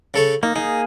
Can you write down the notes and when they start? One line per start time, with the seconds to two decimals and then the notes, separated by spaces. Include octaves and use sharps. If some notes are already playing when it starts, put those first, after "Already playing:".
0.14 C#3 A4 C#5
0.43 A#3 D#4
0.56 A#3 D#4 G#4